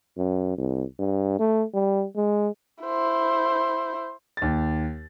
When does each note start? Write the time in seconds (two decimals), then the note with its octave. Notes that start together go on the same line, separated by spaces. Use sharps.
0.17 F#2
0.58 C2
0.99 G2
1.39 A3
1.74 G3
2.16 G#3
2.84 E4 C5
4.37 D#2 A6